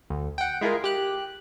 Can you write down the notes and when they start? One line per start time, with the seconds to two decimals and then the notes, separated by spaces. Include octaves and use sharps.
0.10 D2
0.38 F#5 G5
0.61 G#3 E4 F4 G#4 A#4
0.84 G4 F#6